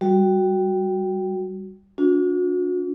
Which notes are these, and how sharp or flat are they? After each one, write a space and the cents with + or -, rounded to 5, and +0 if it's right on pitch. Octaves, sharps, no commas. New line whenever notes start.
G3 -5 F#4 +0
D4 -30 F#4 -40